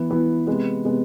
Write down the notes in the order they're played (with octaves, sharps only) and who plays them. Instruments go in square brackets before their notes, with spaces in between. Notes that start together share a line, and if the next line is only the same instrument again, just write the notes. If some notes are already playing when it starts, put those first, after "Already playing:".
Already playing: [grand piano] E3 B3 E4
E3 B3 E4
C3 G#3 B3
C3 G#3 B3